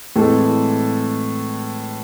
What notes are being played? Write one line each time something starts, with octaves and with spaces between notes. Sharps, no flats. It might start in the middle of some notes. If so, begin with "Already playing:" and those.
A2 E3 G#3 C4 A4